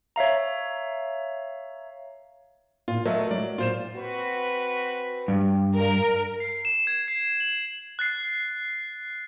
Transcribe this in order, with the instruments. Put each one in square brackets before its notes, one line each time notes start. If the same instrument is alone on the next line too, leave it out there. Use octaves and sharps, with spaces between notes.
[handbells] C#5 E5 F5 A#5
[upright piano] A#2 [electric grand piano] F4
[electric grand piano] F#3 A3 [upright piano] A#4 D#5 E5
[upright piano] F#3 [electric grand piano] D5
[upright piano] A#2 [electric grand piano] F4 C5 E7
[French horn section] C4 F#4 B4
[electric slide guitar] G2
[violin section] A#4
[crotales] C7
E7
G#6
C7
F#7
F#6 A6 C7